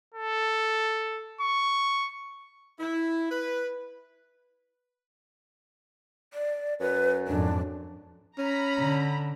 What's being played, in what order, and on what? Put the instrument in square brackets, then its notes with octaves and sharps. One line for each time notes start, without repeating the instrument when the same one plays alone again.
[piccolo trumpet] A4
C#6
[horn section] E4
B4
[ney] D5
[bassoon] F#2 [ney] B4
[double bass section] F2 G#2 [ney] D4
[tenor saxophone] C#4 [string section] A#5 B5
[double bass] D3